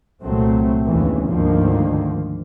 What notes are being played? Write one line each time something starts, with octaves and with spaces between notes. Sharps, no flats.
C2 A#2 F#3 A3 C4
G1 D#2 A2 C#3 E3
D2 G#2 D3 D#3 F3 A#3